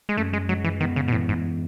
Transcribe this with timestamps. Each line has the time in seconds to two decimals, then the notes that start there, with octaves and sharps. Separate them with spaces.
0.09 G#3
0.17 F#2 A3
0.33 G#3
0.49 F#3 G#3
0.64 E3
0.80 D#3 B3
0.96 C#3
1.08 B2
1.12 A2 E3
1.29 G#2